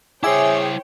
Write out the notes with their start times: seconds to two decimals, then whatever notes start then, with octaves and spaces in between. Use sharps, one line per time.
0.23 E4 G#4 C5 C#5 E5 G5 G#5 D6